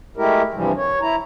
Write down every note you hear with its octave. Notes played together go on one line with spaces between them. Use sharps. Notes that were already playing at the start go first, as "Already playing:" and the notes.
G#3 A3 E4 G4 A#4
G2 C3 E3 F3 G3
C#5
E4 A#5